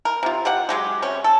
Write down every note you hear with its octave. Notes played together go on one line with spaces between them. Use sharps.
A#4
C3 F4
G4 F5 F#5
F#3 G#3 G4
C3 C#4
A4